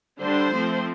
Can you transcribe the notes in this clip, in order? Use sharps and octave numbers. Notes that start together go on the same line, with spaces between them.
D3 G3 D4 C5
F3 A3 C4